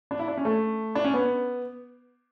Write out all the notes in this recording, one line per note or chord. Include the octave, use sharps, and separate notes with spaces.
D4
E4
D4
C#4
A3
D4
C#4
B3